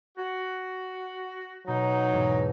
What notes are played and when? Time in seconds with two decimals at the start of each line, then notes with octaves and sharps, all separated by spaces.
0.18 F#4
1.68 B2 F#3 D#4
2.12 E2 G#2 B2